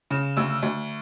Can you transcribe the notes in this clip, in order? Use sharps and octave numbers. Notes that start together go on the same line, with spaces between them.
C#3
D2 E6
D2